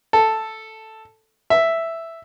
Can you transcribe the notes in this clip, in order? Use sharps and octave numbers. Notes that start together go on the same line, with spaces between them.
A4
E5